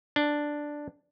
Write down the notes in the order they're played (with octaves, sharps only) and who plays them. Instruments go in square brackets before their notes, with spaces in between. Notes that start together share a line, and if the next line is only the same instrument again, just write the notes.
[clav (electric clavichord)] D4